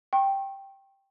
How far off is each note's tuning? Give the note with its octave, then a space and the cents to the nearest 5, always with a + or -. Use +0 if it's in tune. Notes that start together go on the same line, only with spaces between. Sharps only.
G5 +0 C#6 -40